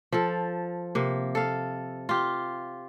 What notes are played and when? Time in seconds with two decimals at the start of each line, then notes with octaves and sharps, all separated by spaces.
0.12 F3 A4
0.95 C3 A#3
1.35 A4 F5
2.09 F4 G4